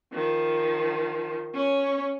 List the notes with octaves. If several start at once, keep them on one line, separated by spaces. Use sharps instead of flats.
D#3 F3
C#4 C#5